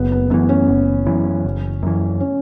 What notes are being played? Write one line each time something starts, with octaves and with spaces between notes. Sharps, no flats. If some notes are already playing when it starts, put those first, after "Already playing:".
Already playing: F#1 B3
B3
F#2 E3 B3
C#4
F#1
F#2 E3
F#1
F#2 E3
C#4